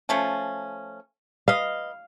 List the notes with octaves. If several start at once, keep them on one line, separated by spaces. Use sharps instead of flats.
F3 A3 C#4
B4 D#5 F5